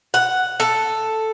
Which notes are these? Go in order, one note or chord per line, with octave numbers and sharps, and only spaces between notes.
F#5
A4